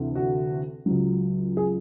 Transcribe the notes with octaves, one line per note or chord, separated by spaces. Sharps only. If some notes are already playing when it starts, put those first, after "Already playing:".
Already playing: D2 C3 E3
F#4
C#2 C#3 F#3
G#4